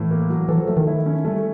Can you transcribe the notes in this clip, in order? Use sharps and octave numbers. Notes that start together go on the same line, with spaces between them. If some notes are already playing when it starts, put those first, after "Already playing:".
Already playing: A2 E3
A#3
F#3
E3 A4
F3
F#3 A3
D#3
E4
C#4
G3 A3